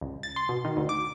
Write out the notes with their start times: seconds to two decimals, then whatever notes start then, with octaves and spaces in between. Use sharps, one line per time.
0.01 C#2
0.23 A6
0.36 C6
0.49 B2
0.65 D#3
0.77 D2
0.89 D6